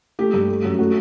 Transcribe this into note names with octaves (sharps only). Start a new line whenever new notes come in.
A3 G4
G2
A3
F#2
A3 F#4